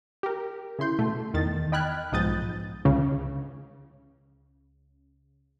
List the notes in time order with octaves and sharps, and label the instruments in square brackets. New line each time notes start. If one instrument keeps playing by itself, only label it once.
[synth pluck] G4 A#4
C#3 E4 C6 G6
B2 A3
E2 D#3 A6
D#5 G5 B5 F6 F#6 G#6
B1 G#2 F3 D#6 G6 A6
[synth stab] C#2 C#3